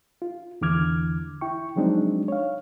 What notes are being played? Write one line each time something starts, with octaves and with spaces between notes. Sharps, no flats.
F4
E2 D3 E3 D6 F6 G#6
E4 G5 C#6
F3 F#3 G#3 C4 D4 D#4
C#5 F5